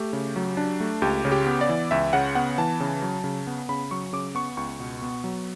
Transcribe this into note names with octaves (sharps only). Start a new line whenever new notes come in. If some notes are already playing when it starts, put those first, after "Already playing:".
Already playing: A3 G4
C#3
F#3
D4
A3
C#2 G4
C#3
G4
B3
D5
E3
C#2 E5
C#3 F#5
B3 F#5
E3 A5
C#3
F#3
C#3
B3
C#3 B5
F#3 C#6
C#3 D6
B3 C#6
C#2 C#6
B2
B3
F#3